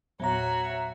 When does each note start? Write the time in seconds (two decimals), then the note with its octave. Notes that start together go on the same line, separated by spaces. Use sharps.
0.20 E2 A#2 F#3 B3 F#4 C#5 E5 A#5